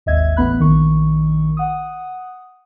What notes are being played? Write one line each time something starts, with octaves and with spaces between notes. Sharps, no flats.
G#1 D#2 D#5 E5 G#6
A1 B3 B5 F#6
A#1 D#3 C#6
F#5 D#6